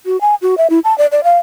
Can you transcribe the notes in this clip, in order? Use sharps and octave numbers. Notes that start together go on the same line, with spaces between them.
F#4
G#5
F#4
E5
E4
A5
D5
D5
F5